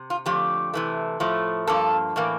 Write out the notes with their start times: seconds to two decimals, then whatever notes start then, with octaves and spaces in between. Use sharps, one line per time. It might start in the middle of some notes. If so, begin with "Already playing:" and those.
Already playing: C3
0.10 F4
0.26 F2 D3 F3 A3 G4
0.74 C3 E3 A3
1.20 A2 F3 A3
1.67 G2 F3 A#3 A4
2.16 A2 E3 A#3